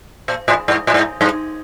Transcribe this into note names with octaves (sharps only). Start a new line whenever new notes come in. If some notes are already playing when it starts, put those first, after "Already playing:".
A#2
A2
G#2
A2
G#2
G2